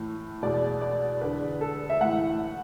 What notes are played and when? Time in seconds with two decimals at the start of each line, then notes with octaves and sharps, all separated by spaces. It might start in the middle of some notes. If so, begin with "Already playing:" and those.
Already playing: A2 E3
0.42 E2 B2 D5
0.81 D5
1.21 E2 D3 B4
1.61 A4
1.90 E5
2.01 A2 E3 F#5